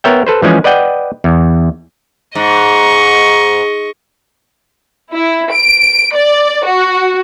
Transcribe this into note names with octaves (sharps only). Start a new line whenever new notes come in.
B3 A#4 C#5 E5 G5
A4 B4 C5
E3 F3 G#3 C#4 G#4
B4 D5 D#5 F#5 G5
E2
G#2 D#5 C#6
E4
D7
D5
F#4